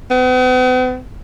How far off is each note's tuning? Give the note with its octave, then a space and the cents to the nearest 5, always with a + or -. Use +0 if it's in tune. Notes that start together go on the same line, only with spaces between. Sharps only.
B3 +45